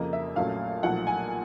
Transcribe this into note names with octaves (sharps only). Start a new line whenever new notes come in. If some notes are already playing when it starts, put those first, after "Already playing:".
Already playing: F2 C#3 F3 A#3 D#5
E5
A#1 A#2 F#3 A3 C#4 F5
B1 A#2 F3 A3 F#5
G#5